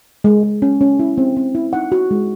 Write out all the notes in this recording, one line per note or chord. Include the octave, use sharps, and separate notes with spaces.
G#3
G#3
C#4
C#4
E4
C4
C4
E4
D#4 F#5
F#4
G#3